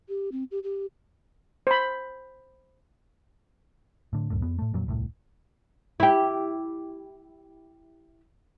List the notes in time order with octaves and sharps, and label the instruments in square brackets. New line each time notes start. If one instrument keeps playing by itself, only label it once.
[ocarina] G4
C4
G4
G4
[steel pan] C5 B5
[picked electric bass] A2 D3
C#2 F#2 A2
F2 B3
A2 A3
F2 A#2 F#3
D#1 C2 A2
[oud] E4 G4